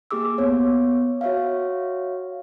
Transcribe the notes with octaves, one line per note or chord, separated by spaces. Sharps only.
A#3 G4 G#4 D6 E6
B3 C#5
F#4 C#5 E5 F5